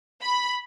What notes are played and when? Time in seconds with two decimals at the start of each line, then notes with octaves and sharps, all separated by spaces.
0.21 B5